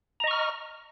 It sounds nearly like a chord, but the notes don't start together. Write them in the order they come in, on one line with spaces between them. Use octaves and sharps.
A#5 D#5 C#6 F6